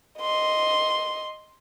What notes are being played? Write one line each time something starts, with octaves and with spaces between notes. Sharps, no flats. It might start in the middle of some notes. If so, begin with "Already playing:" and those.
D#5 C6